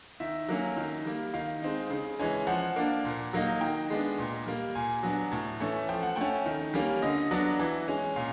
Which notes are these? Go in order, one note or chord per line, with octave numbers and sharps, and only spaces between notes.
D#3 E5
F#3 A#3 C#4
D#3
G3 A#3
D#3 F5
G#3 C4 D#4
C#3
E3 G#3 C#4
F3 F#5
A#3 D4
A#2
F#3 A#3 D#4
D#3 G5
G#3 B3 D4
A#2
G3 A#3
A#2 G#5
F#3 B3 D4
A2
E3 A3 C#4
F3 G5
F#5
A3 C#4 G5
D#3
G3 A#3 C#4
D3 D#5
F#3 B3 D4
E3
G#3 C#4
A#2 F5